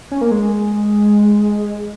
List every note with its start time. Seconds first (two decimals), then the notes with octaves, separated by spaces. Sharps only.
0.11 C#4
0.21 A#3
0.31 G#3